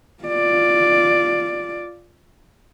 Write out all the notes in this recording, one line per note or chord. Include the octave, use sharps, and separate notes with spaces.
F4 D5